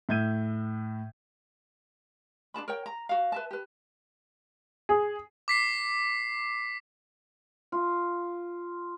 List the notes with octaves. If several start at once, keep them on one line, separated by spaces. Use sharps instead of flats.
A2 E5 G6 G#6 D#7
D4 F4 A5 B5
A#4 C#5 G5
A#5
F#4 F5
B4 E5 A5
G4 B4
G#4
D6 B6 C7
F4